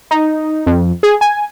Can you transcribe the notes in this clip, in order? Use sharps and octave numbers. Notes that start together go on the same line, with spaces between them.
D#4
F2
G#4
G#5